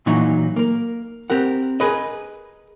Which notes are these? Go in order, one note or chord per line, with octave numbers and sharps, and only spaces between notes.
A#2 E3 F#3 D#4 F#4
A#3 A#4
C4 G4 A#4 F#5
G#4 A#4 B4 D#5